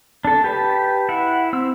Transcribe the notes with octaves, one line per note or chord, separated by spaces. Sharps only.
D4 A4
G4 B4 A5
E4 F#5
C4 E6